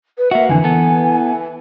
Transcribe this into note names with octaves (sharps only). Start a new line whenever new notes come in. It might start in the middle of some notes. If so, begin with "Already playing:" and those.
B4
A#3 F#4 E5
F2 D3 E3 G#5
B3 A4